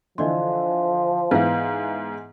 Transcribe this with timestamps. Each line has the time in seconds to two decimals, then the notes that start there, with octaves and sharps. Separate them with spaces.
0.18 D3 E3 F3 D5 D#5 C6
1.31 G#2 E3 B3 B4 F5